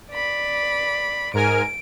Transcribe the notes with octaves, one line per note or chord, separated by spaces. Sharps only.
D5 B5
G#2 A#4 G#5 D7